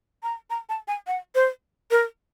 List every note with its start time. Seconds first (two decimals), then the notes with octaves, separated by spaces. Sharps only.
0.23 A#5
0.50 A#5
0.69 A5
0.88 G#5
1.07 F#5
1.35 C5
1.91 A#4